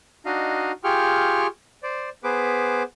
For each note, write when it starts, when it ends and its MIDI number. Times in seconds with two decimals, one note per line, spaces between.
0.26 0.72 62
0.26 0.72 63
0.26 0.72 66
0.26 0.72 75
0.26 0.72 77
0.84 1.47 65
0.84 1.47 67
0.84 1.47 68
0.84 1.47 79
0.84 1.47 85
0.84 1.47 89
1.83 2.09 72
1.83 2.09 74
2.24 2.83 59
2.24 2.83 68
2.24 2.83 71
2.24 2.83 72
2.24 2.83 86